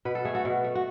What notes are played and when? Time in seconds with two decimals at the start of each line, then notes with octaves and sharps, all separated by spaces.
0.05 B2 B4
0.15 A4
0.25 A3 G#4
0.35 F#4 A4
0.45 B2
0.64 A3
0.75 F#4